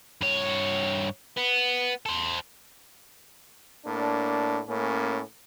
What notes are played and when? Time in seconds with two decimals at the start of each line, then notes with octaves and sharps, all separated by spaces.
0.21 G2 C#5
1.37 B3
2.06 A4 C5
3.86 A2 A#3 D4
4.68 A2 A#3 C#4